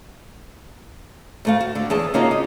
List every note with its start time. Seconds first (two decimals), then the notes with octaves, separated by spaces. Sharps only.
1.45 D2 A3 F5
1.61 F#4
1.75 D3
1.90 E2 G#4 A5
2.14 C#3 A#3 C#4 D#4 F4 F#4
2.31 D#5